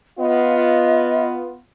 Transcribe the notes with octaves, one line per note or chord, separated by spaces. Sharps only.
B3 F4 D#5